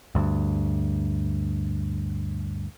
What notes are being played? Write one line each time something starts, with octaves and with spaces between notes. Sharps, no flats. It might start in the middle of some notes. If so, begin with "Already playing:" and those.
D2 G2